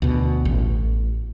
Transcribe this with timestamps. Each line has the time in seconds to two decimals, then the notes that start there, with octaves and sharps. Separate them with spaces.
0.02 D2 B2
0.45 A1